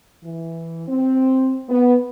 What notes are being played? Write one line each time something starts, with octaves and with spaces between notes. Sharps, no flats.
E3
C4
B3